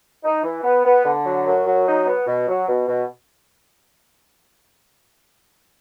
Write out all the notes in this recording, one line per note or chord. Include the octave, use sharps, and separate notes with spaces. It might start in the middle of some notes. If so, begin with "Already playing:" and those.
D#4
E3
B3
B3
D3
F#3
F#2
F#3
D#4
B3
B2
F#3
B2
B2